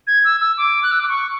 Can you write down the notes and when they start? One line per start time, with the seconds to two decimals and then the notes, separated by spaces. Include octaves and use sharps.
0.07 G#6
0.25 E6
0.41 E6
0.57 D6
0.83 F#6
0.92 E6
1.00 D6
1.09 C#6